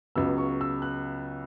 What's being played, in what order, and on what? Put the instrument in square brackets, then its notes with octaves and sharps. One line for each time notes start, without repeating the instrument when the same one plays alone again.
[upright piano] C#2 C#3 F#3 B3 E6
C#6
E6
F#6